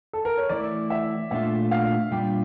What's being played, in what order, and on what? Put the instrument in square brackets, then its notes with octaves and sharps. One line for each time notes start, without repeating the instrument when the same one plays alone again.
[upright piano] A4
A#4
C#5
[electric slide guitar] E3 A3 E4 [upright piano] D5
[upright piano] E5
[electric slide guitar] A#2 A3 D4 F4 [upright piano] E5
[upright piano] F5
[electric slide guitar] A#2 G3 D4 F4 [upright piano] G5